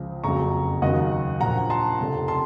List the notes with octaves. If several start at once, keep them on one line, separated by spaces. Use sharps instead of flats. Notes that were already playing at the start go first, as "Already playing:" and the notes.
Already playing: C#2 C#3 F3
F#1 F2 C#3 F#3 A#5 C#6
D#2 C#3 F#3 D#5 F#5
A#1 A#2 F3 F#5 A#5
A5 C6
F1 F2 C#3
A5 C6